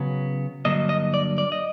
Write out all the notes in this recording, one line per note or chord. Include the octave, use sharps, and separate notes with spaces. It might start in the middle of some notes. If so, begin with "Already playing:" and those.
Already playing: C#3 F#3 B3
G2 D3 F#3 A#3 D#5
D#5
D5
D5
D#5